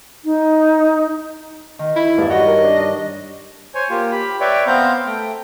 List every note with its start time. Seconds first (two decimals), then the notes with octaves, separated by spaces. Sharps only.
0.25 D#4
1.79 D#3
1.96 E4
2.17 E2 G2
2.30 F#4 C#5 D#5
2.47 A#4
2.64 D4
3.75 C5 C#5 G#5
3.90 A#3 F4 G4
4.12 G4 B5
4.40 B4 C#5 D5 E5 G5
4.67 B3 C4 C5 F5 A#5 G6
5.06 A3 G5